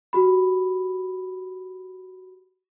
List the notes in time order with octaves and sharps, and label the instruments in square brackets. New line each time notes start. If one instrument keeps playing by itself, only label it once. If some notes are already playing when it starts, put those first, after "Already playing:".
[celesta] F#4 G4 B5